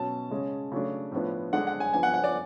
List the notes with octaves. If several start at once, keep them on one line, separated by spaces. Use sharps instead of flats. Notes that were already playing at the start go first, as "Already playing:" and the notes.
Already playing: B2 F#3 C#4 A5
C#3 G#3 C#4
C#3 F#3 A3 D4
A2 F3 B3 D4
D3 G#3 D4 F#5
F#5
G#5
F3 B3 D4 G#5
F#5
F#5
D5